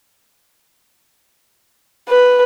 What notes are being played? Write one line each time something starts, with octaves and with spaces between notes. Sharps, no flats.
B4